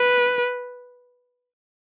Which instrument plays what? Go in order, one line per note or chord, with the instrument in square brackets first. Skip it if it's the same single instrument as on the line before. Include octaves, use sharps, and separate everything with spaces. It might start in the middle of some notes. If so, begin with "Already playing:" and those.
Already playing: [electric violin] B4